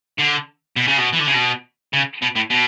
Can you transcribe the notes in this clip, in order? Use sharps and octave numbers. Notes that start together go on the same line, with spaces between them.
D3
B2
C#3
B2
E3
D3
C#3
B2
C#3
B2
A2
B2